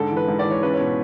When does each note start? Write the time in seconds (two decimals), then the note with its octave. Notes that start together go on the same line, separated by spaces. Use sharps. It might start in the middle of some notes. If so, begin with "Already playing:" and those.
Already playing: G#2 D3 A4
0.11 E3
0.17 B4
0.28 G#2
0.39 D5
0.46 E3 C#5
0.63 C#2 B4
0.74 C#5
0.80 B2